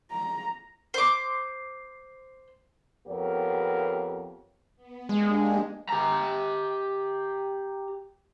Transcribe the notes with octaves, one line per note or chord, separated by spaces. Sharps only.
A#5
C5 D6
F2 B3 G4 A#4 C#5
B3
G#3 A#3 D4 G4
G4 A#5